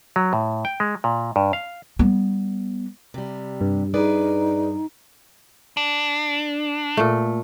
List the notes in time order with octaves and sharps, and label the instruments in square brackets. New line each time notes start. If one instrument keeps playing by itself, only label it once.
[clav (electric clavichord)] F#3
A2
G5
G#3
A#2
G2
F5
[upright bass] G3 B3
[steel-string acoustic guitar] C3 G3
[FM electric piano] G2
[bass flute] D#4 [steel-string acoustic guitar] G#4 B4 D5
[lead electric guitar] D4
[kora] A#2 A3